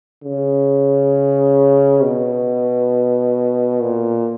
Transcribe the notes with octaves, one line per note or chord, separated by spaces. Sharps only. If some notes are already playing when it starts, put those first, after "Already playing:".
C#3
B2
A#2